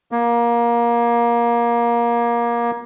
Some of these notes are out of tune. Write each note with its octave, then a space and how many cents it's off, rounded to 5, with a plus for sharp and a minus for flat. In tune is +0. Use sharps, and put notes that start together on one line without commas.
A#3 +20